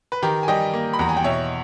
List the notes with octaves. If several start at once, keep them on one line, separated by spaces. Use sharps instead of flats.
B4
D#3 G4 A#4
G#5
G3 D#5 G5
A#3
B5
E2 A#5
G#5
G5
B2 C#5 E5